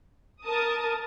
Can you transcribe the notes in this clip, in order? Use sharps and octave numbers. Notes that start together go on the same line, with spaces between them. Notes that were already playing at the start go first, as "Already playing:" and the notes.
A#4 A5 D#6